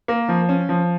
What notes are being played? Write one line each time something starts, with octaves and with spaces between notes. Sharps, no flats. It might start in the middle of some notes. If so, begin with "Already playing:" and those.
A#3
F3
C#4
F3